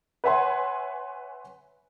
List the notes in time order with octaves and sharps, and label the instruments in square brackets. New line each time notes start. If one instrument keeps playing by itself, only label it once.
[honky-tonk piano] B4 C#5 E5 F#5 G#5 C6